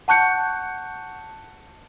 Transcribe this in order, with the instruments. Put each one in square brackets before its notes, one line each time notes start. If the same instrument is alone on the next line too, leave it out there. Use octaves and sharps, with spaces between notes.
[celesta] F#5 A5 C#6 F#6 G6 C#7